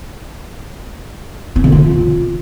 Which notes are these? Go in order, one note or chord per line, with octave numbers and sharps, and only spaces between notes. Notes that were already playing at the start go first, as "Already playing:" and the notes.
C4
D3
F4